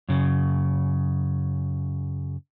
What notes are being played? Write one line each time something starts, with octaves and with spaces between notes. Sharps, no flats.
F#2 C#3